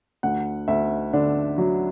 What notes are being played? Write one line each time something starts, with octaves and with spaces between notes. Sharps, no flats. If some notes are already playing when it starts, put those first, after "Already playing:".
D2 F#5
D2 E5
D3 D4
F#3